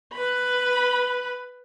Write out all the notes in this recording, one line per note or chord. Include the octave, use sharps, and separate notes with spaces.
B4 B5